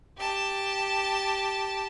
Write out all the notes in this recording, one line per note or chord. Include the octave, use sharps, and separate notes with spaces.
G4 A5